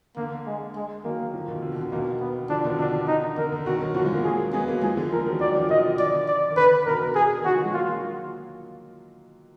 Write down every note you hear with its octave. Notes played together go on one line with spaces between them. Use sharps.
D3 A#3
G#3
G#3
D#3 F#3 A#3
D3 F3
B2 D#3
D3
B2
D3
B2 D#3 A#3
B3
D3 F3 D4
B2 D#3
D3 D4
D#4
D3 A#4
D3
B2 D#3 F#4
D#3 F#3
D3 F3 F#4
F3 G#3
F#3 A#3
G#4
G#3 B3 G#4
F#3 A#3
F3 G#3 G#4
D3 F3
D3 F3 A#4
D#3 F#3
D#3 F#3 D5
D3 F3
B2 D#3 D#5
D3 D5
D5
D#3
D3 B4
B2 D#3 A#4
B2 D#3
G#4
D#3
D3 F3 F#4
D#3 F#3
F3 G#3
F#3 A#3 F4